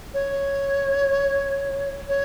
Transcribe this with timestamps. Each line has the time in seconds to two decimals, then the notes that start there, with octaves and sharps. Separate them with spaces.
0.14 C#5
2.09 C#5